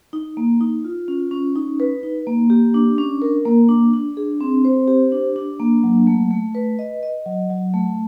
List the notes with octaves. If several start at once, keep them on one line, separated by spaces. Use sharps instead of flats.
D#4
A#3
D#4
F4
C#4
C#4
D#4
B4
D#4
A#3
G4
D4
C#4
A#4
A#3
D4
D4
G#4
C4
C5
G4
D4
D4
A#3
F#3
A3
A3
B4
D#5
D#5
F#3
F#3
A3